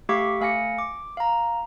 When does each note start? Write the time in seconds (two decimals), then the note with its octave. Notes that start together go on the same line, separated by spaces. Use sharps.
0.09 A3 G4 F5 C#6 D6 B6
0.41 A3 F5 G#5 A#6 C#7
0.79 D6
1.17 F5 A#5